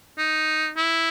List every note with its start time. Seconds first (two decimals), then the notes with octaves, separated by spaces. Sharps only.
0.18 D#4
0.76 E4